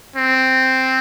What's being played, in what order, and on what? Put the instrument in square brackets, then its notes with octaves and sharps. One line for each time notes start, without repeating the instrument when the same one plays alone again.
[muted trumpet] C4